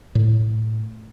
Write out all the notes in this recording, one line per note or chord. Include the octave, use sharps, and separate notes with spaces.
A2